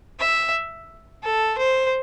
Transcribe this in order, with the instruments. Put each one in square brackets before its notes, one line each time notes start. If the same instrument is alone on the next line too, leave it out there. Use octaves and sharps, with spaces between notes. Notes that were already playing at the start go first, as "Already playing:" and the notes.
[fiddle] E5
A4
C5